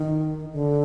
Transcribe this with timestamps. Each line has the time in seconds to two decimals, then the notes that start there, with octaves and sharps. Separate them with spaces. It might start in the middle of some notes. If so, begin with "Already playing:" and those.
Already playing: D#3
0.52 D3